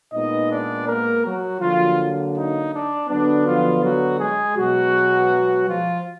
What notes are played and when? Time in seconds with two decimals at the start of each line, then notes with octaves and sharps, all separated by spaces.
0.13 A#2 G#3 B3 D#4 D#5
0.51 D4 D5
0.87 A#3 A#4
1.25 F#3 F#4
1.61 D3 F3 F#3 A#3 F4
2.35 D#4
2.72 D4
3.09 D3 F#3 B3 D4
3.45 F3 F4
3.83 F#3 F#4
4.19 G#3 G#4
4.56 B2 F#3 G#3 B3 F#4
5.67 F3 F4